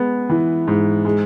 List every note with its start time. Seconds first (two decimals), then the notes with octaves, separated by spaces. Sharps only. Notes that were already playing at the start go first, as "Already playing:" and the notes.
Already playing: G#3 B3
0.29 E3
0.67 G#2
1.05 G#3